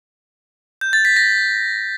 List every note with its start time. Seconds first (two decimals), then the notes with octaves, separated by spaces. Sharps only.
0.81 G6
0.93 A6
1.05 B6
1.16 A#6